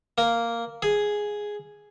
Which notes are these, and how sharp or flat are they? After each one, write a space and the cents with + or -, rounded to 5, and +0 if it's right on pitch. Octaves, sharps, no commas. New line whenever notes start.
A#3 -5
G#4 +0